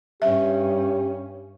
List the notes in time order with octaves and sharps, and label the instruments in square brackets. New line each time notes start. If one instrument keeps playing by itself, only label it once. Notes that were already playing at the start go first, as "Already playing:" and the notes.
[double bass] G2 C#4 [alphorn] G4 [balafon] E5